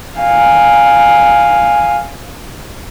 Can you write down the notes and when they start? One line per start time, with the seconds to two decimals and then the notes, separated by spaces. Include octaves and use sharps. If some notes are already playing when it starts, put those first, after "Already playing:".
0.19 F5 G#5